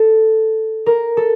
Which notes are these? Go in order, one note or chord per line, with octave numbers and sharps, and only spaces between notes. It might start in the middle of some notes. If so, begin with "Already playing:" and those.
Already playing: A4
A#4
A4